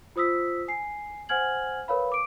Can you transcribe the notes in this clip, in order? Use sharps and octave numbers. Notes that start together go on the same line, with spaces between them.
F4 C5 D#6 E6 B6
G#5 C7
C5 F#5 G#5 F6 G#6 F#7
A#4 B4 C#5 F5 B5
D6 D7